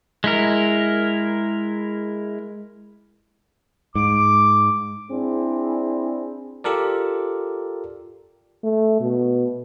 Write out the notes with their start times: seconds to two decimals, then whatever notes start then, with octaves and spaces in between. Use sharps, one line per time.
0.24 G#3 E4 A#4
3.95 G#2 D6
5.10 C4 D4 E4 G#4
6.64 F4 G4 A4 A#4 D5
8.63 A3
9.01 B2